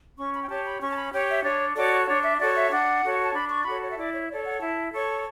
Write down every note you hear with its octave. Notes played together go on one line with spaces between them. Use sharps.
C#4 C#6
B5
G5
G4 C#5 A5
B5
C#4 C#6
A5
B5
G4 C#5 G5
E5
D4 C#5
F#4 A4 C#5 D5
D4 C#5
E5
F#4 A4 C#5 D5
E5
D4 F#5
F#4 A4 C#5
A5
D4 B5
C#6
F#4 A4 C#5 B5
C#5
E5
E4 D5
C#5
A4 C#5 D5
F#5
E4 A5
A4 C#5 C#6